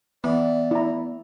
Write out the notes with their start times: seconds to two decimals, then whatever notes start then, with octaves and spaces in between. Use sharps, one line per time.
0.24 E3 B3 D5
0.71 E4 A#5